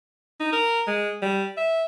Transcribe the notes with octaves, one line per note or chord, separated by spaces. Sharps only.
D#4
A#4
G#3
G3
E5